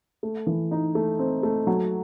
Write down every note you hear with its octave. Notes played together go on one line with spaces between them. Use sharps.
A3
E3
D#4
A3
C4
A3
F#3